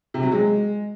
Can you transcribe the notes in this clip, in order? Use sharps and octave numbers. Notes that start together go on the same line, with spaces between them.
C3
F#3
G#3